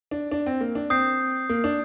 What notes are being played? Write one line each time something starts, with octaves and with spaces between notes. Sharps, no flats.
D4
D4
C4
A#3
D4
C4 D#6 G6 C7
A#3
D4